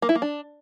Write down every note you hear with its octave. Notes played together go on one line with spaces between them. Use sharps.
A#3
E4
A#3
D4